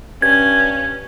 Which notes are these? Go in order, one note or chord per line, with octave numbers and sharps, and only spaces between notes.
G2 C#4 G#6